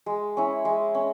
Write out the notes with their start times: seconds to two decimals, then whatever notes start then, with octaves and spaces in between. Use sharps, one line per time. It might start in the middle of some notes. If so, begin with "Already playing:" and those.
0.06 G#3
0.37 C#4 E4
0.65 G#3
0.95 C#4